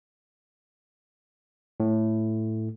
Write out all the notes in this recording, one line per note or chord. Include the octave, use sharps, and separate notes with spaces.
A2